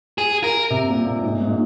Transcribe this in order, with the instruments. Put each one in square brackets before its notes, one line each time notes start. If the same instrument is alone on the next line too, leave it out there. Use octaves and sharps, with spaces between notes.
[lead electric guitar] G#4
A#4
[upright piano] C3
A#2
A#2
G#2
G#2
A#2